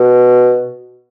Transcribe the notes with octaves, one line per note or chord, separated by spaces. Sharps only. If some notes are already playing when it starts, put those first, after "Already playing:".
Already playing: B2